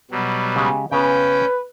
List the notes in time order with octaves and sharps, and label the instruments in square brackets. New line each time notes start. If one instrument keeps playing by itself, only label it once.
[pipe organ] B2 F#3 G3
[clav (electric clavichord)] C#3 G#3 G4
[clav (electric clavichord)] C#3 B3 [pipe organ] C#4 G5 [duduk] B4